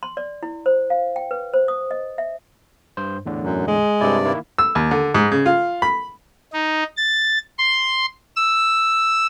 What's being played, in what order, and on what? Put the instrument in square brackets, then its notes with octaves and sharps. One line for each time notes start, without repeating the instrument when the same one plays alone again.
[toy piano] C6
D5
E4
C5
F5
G5
B4
C5
D#6
D#5
E5
[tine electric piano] G2 C5
E2 A2 D3
[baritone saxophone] F#2
G#3
[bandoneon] G2 C3 D5 [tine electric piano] E4 A4
[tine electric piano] D#3 A#3 E4
[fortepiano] E6
D#2
D3
G#2
C#3
F4
B5
[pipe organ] D#4
A6
C6
E6